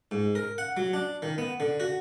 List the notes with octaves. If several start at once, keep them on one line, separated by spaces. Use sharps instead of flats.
G#2
A#4
F#5
F#3
D4
D#3
B3
D3
F#4